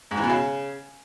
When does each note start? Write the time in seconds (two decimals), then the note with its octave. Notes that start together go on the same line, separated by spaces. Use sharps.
0.11 G#2
0.17 E3
0.23 B2
0.29 C#3